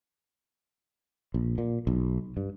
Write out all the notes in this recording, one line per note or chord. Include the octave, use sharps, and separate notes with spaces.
A#1
A#2
B1
G2